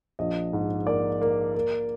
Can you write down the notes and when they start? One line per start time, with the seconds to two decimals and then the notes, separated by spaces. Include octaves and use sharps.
0.19 A#1 D#5
0.53 G#2
0.87 A#3 D5
1.22 A#3
1.55 A#3